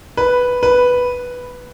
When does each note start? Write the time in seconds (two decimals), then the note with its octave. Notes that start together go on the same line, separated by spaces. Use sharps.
0.17 B4
0.63 B4